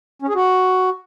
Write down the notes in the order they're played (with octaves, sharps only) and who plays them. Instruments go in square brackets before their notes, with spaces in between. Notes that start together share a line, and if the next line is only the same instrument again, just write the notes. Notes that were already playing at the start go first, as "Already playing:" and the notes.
[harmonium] C#4
G#4
F#4